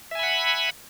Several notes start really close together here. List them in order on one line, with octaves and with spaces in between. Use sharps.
E5 G#5 B5 F#5